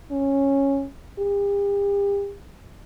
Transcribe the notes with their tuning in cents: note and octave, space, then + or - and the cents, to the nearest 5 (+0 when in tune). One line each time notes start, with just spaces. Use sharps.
C#4 -10
G4 +40